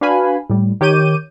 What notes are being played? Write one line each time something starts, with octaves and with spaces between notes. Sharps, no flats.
D4 F#4 B4 F5 G#5 B5
A2 G3
D#3 G4 C#5 D6 G6 D#7